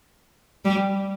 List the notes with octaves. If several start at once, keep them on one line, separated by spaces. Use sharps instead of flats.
G3